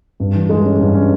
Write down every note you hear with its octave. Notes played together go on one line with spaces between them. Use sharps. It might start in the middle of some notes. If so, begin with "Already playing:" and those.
G2
E3
G#3
C#4
G2
C#4